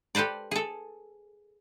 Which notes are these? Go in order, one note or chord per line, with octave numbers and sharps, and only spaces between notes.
G4 A4 B4 C5 D5
G#4 A4